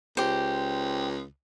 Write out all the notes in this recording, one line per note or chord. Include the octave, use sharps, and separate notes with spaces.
C#2 G4 C5